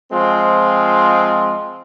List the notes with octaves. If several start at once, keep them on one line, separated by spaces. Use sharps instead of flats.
F3 G#3 C4 F4